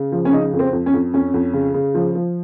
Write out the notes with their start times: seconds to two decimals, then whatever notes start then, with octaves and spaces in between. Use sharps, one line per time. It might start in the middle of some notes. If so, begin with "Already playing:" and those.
Already playing: C#3
0.12 F3
0.25 C#4
0.33 C#3 D#4
0.53 F2
0.59 C4
0.73 F2
0.86 C#4
0.94 F2
1.14 F2 C#4
1.34 F2
1.53 C#3
1.74 C#3
1.95 F3
2.15 F3